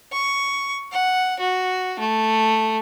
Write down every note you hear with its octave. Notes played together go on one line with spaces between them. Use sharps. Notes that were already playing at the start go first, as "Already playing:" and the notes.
C#6
F#5
F#4
A3